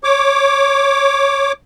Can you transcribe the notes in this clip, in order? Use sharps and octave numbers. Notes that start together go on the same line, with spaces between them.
C#5 D6